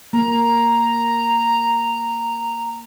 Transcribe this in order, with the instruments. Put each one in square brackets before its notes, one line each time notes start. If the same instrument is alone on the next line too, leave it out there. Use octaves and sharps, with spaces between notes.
[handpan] A#3 [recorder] A#5